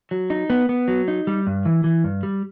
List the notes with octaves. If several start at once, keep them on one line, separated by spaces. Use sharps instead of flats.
F#3
D#4
B3
B3
F#3
D#4
G3
G2
E3
E3
G2
G3